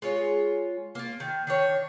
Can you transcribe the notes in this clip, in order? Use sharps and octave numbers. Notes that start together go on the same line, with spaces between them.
G#3 F4 C#5
A#3 F4
D#3
D#3 D4 C#5